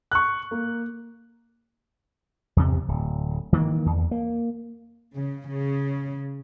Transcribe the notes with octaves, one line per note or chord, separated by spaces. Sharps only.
C#6 F#6
A#3
E2 C3
D1
D#3 E3 A#3
E2
A#3
C#3
C#3